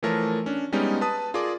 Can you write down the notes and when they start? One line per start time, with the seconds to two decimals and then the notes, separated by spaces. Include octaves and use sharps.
0.03 E3 F3 A3 A#4 C#5 A5
0.46 C#4 D4
0.72 G3 G#3 B3 C#4 D#4
1.01 B4 A5 D#6
1.34 F4 G#4 A#4 D5 D6